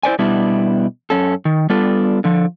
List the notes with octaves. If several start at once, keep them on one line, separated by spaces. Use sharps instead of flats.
E4 C5 D5 G#5
B2 G3 B3 D4 E4
F#2 C#4 A4
D#3
G3 B3 D4 F4 A4
D3 F3